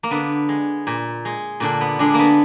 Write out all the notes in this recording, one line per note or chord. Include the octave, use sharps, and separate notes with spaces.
A#3
D3 B3
G#3
A#2
G#3
A#2 D3 D4
B3
D3 G#3 D4
A#3
B3